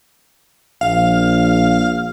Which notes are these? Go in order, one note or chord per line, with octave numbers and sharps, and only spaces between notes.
A#1 F5